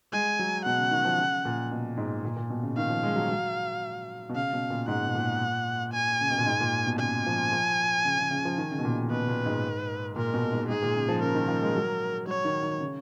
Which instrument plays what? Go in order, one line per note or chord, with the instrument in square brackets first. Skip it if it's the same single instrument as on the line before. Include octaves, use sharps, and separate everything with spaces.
[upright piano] G#3 [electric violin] G#5
[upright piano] F#3
[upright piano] B2 [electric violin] F#5
[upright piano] C#3
D#3
F3
C#3
A#2
B2
G#2
A#2
A#2
B2
C#3
[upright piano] D#3 [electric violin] F5
[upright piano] F3
G#3
F#3
F#3
B2
[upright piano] C#3 [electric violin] F5
[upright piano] B2
A#2
[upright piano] G#2 [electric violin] F#5
[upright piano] B2
A#2
[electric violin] G#5
[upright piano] C#3
B2
A#2
G#2
A#2
B2
[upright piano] C#3 [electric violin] G#5
[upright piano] F3
F3
C#3
C#3
C#3
F3
D#3
C#3
B2
A#2
C#3
[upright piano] B2 [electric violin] B4
[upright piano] A#2
G#2
[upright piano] A#2 [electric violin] A#4
[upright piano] B2
G#2
[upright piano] G#2 [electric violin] G#4
[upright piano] A#2
C#3
F3
[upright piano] C#3 [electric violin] A#4
[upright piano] D#3
F3
G#3
F#3
[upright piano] F#3 [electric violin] C#5
[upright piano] D#3
D#3
C#3